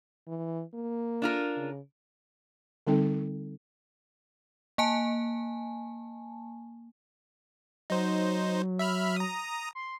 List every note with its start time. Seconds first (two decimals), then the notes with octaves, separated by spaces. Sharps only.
0.27 E3
0.74 A#3
1.22 D4 F4 A#4
1.56 C#3
2.87 D3 G3 C4 D#4 A4 G5
4.78 A#3 G#5 A5
7.90 F#3 D#4 C5
8.79 E5 B5 F6
9.16 A#5 D#6
9.75 C6